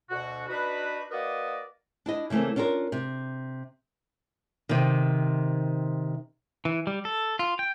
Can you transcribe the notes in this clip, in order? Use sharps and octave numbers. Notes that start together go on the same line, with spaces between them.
D2 B2 F#4
D4 D#4 F#4 B4
A#3 F#4 A#4 B4 D5 D#5
D4 E4 D#5
C#3 E3 A3 A#3 C4
C#4 D4 F4 A4 A#4
C3
C3 D#3
E3
G3
A4
F4
G5